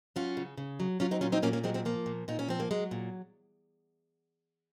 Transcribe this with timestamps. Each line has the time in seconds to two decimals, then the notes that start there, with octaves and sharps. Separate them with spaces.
0.16 F#3 C#4 F4
0.37 C#3
0.58 C#3
0.80 F#3
1.00 F#3 C#4 F4
1.11 C4 D#4
1.21 A#2 C#4 F4
1.32 C4 D#4
1.43 A#2 A#3 C#4
1.53 A#3 C#4
1.64 F#3 G#3 C4
1.74 G#3 C4
1.85 F3 A#3
2.06 A#2
2.28 A#2 D#4
2.39 C#4
2.48 F3 C4
2.60 A#3
2.71 F#3 G#3
2.91 A#2